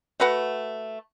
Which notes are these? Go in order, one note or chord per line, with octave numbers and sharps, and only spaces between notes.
A3 F#4 B4 F#5